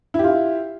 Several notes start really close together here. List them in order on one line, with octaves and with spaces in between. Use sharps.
E4 G4 F4